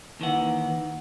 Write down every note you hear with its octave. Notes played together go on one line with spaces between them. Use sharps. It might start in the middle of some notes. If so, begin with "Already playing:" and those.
D#2 D#3 E3 F#5